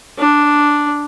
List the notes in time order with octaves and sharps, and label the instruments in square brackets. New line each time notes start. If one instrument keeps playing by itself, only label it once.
[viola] D4